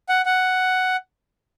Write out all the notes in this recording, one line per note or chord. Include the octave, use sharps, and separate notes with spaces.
F#5
F#5